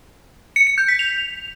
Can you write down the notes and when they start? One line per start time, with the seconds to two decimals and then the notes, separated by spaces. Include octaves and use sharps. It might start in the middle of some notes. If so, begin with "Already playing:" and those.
0.56 C#7
0.67 C#7
0.78 G6
0.88 B6
0.99 F7